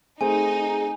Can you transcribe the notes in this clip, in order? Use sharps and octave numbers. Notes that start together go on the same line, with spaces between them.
A3 C4 D#4 G#4 G#5